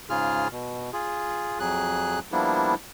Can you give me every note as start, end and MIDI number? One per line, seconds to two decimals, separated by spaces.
0.10 0.48 44
0.10 0.48 49
0.10 0.48 65
0.10 0.48 68
0.10 0.48 89
0.51 0.91 47
0.93 1.59 65
0.93 1.59 68
1.60 2.19 41
1.60 2.19 54
1.60 2.19 68
1.60 2.19 90
2.32 2.75 53
2.32 2.75 55
2.32 2.75 58
2.32 2.75 59
2.32 2.75 62
2.32 2.75 64